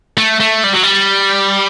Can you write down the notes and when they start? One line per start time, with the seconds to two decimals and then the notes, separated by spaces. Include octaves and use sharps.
0.18 A3
0.40 A3
0.64 G3
0.73 F#3
0.83 G3